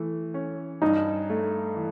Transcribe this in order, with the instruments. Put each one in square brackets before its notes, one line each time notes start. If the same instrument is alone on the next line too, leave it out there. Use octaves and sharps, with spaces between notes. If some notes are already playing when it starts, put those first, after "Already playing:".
Already playing: [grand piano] E3 A3
C#4
[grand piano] G2 [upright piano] D#4
[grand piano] A3
E3